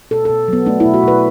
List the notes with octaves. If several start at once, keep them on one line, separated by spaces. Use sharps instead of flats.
B2 A4
A4
B2
F#3 B3
A3 D4
E4
B2
F#4
B2 B4